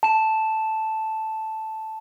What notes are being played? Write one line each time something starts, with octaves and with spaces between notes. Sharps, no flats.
A5 E7